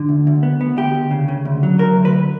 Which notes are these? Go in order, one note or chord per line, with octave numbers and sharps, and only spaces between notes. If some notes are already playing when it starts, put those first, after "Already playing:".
Already playing: D3
D2
D2
B3
B3
D2 G4
D2
C#3
C#3
D2
F#3
F#3 A#4
D2
B4
D2